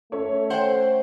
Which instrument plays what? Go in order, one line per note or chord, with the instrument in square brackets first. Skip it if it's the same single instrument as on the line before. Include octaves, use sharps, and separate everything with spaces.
[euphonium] A3 [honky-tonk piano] C#4 A4 C#5
[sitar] C5 [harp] F#5 G5